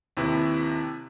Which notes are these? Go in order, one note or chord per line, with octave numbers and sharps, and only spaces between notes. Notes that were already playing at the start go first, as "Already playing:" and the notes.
D#2 C3 E4 B4